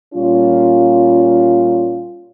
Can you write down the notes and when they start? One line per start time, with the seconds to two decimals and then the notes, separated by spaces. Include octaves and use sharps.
0.14 A#2 G3 C#4 F4